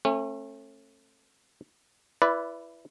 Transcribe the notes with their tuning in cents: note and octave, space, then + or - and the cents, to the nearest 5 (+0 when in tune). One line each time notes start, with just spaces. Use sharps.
A3 +15 C#4 -40
E4 +20 B4 +0 D5 -10